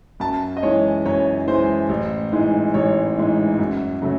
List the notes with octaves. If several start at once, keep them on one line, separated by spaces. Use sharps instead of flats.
F#2 A5
D#5
E3 G#3 C#5
F#2 C#5
E3 G#3 C5
A1
G#2 E3 G#3
A1 C#5
G#2 E3 G#3
F#2
C#3 F#3 A3